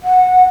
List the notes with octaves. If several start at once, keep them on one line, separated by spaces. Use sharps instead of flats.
F#5